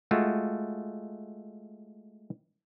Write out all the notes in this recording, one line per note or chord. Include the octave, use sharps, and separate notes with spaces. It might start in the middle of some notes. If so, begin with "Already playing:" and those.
G#3 A3 F4 F#4